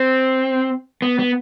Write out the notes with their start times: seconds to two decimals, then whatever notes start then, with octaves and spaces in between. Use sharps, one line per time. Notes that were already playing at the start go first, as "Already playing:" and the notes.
Already playing: C4
1.02 B3
1.19 B3